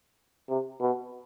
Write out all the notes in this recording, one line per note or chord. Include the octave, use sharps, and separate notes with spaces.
C3
B2